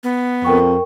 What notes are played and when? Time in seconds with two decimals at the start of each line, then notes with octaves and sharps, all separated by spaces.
0.03 B3
0.45 F2 A#4 G5 C#6